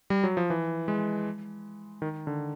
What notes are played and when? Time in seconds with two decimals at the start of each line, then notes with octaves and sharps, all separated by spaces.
0.10 G3
0.24 F#3
0.37 F3
0.50 E3
0.88 G#3
2.02 D#3
2.27 D3